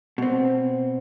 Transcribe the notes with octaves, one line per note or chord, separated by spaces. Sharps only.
B2 C4